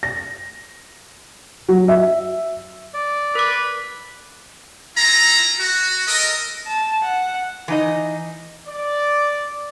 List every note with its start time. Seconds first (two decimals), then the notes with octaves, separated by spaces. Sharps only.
0.03 A#6
1.69 F#3
1.88 E5
2.94 D5
3.35 A#4 B4 D6
4.97 E4 F4 A4 A#5
5.58 F#4
6.05 A4 A#4 D#5
6.67 A5
7.04 F#5
7.68 E3 D#4 D#5
8.68 D5